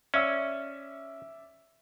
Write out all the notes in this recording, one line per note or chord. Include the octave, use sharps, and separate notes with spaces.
C#4 D5 E5 E6